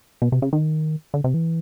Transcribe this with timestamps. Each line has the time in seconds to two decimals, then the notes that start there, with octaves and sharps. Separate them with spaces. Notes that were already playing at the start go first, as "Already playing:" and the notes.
0.22 B2
0.32 C3
0.42 C#3
0.53 D#3
1.14 D3
1.24 C3
1.34 E3